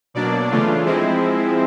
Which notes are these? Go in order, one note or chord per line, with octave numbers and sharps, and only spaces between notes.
B2 F#3 A#3 D4 D5
C#3 E3 A3 D4 F4
F3 G#3 C4 E4